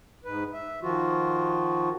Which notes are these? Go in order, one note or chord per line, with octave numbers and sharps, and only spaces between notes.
G#2 B4
E5
D#3 F3 F4 F#4